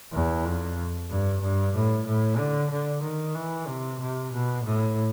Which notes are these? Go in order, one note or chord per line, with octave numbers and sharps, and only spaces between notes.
E2
F2
G2
G2
A2
A2
D3
D3
D#3
E3
C3
C3
B2
A2